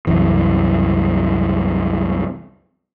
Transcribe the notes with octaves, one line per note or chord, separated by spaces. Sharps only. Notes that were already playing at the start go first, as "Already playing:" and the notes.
C2 F#2 E3